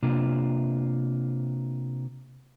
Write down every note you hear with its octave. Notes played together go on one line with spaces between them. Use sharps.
C3 A#3 D4 F4